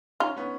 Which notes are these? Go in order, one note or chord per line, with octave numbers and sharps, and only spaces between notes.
C#4 D#4 F4
B3 C#4